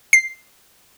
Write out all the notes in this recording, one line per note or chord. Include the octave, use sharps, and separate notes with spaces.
C7